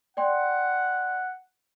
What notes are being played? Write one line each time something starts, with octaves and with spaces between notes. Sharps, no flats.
D5 F#5 G5 C6